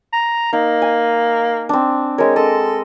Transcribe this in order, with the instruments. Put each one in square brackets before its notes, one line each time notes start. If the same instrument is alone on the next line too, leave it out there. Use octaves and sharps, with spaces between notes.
[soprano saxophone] A#5
[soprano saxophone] A#3 [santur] D#4
[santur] G#5
C4 D4
[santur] G#3 A#4 [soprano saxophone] C#5
[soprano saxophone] A4 [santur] D#5